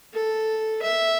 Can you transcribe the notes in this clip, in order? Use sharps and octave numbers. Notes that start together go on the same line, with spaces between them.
A4
E5